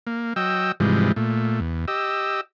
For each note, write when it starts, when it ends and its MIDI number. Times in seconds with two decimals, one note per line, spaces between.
0.07 0.33 58
0.36 0.72 54
0.36 0.72 75
0.36 0.72 79
0.36 0.72 88
0.80 1.12 44
0.80 1.12 48
0.80 1.12 52
0.80 1.12 53
0.80 1.12 55
0.80 1.12 56
1.16 1.60 46
1.16 1.60 57
1.60 1.86 40
1.88 2.41 67
1.88 2.41 75
1.88 2.41 88